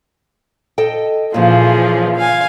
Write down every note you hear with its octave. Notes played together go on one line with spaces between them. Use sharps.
A4 D#5 G5
A#2 C#3 E3 F3 G#4
F5 G#5